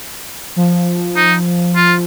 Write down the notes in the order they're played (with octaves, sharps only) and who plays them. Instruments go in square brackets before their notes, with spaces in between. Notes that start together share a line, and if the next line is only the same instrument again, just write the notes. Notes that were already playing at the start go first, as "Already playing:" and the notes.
[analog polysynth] F3
[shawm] D#4
F4